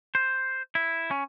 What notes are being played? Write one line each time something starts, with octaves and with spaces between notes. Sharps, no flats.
C5
E4
C#4